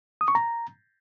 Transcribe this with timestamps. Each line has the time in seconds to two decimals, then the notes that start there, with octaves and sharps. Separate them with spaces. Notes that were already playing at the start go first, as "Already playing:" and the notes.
0.21 D#6
0.28 C#6
0.35 A#5